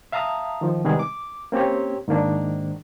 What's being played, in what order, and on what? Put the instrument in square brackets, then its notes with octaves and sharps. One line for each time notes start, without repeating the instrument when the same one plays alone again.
[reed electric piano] E5 F5 A5 A#5 D#6
D#3 F3
C3 D#3 G3 G#3 B3 G#4
D6
A#3 C4 C#4 G4 C#5
G#2 D#3 A#3 D4